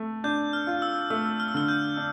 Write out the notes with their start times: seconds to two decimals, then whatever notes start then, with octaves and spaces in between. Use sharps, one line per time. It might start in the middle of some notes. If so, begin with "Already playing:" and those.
Already playing: A3
0.24 D4 G6
0.53 F6
0.67 F4
0.82 E6
1.10 A3 E6
1.40 F6
1.48 E6
1.54 D3 F6
1.68 G6
1.97 D4